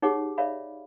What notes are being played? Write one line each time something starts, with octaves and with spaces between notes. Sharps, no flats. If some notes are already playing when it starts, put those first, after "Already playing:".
D#4 G4 G#4 C#5 F#5 D6
C#5 D5 E5 F5 B5